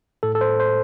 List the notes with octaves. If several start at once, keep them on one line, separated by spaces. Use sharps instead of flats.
A2 A4
A4
C5
A2
C5